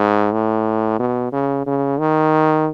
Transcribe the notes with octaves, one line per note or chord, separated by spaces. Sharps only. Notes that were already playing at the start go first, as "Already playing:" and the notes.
Already playing: G#2
A2
B2
C#3
C#3
D#3